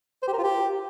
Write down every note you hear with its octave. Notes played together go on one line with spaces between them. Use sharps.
C5
G4
A#4
F4
G4